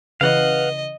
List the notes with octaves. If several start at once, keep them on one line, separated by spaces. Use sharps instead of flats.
C#3 E3 B4 D#5 F5 F#5